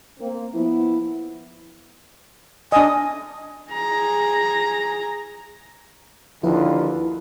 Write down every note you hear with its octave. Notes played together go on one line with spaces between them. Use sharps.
A#3 C4
F3 B3 E4
D4 D#5 G#5
G#4 A#5
D#2 D3 F3 E4 F4 B4